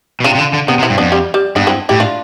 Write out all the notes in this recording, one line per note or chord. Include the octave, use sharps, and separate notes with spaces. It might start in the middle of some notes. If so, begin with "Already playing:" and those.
B2
C3 D4 F4
C3
D3
D3
C3 B3 D4
C3
C4 E4
G2
F2 B3 D4
G3
G3
G2 B3 D4
C4 E4
A2 E4 G4
D4 F4